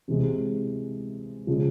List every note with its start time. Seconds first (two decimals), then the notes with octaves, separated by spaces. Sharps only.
0.08 C3 E3 G#3
1.47 C#3 F3 G#3